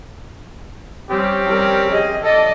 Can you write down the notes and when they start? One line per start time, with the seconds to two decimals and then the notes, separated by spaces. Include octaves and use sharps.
1.11 G3 C4 C#4 G4
1.46 G3 A#4
1.88 G#4 D#5
2.23 A4 D5 D#5